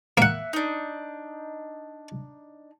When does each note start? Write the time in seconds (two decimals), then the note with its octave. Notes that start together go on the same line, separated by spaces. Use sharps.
0.18 A#3 E5 F#5 F#6
0.53 D4 D#4